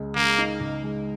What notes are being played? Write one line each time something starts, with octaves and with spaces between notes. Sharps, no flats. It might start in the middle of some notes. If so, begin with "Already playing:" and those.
Already playing: C#2 G#3
C#3 A#3
D#4
C#2
G#3